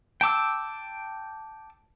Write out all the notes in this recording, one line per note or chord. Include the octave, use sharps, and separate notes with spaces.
G5 A5 D6 E6